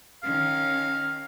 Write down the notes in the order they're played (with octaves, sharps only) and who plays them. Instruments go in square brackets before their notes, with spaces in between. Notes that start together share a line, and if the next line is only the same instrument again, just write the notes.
[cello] D#3 C#4 [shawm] F5